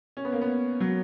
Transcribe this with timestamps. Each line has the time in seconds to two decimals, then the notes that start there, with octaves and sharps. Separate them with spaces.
0.17 C#4
0.25 B3
0.32 A#3
0.41 B3
0.80 F#3